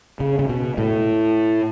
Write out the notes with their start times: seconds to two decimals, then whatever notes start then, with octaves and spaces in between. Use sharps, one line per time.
0.20 C#3
0.39 C#3
0.49 B2
0.78 A2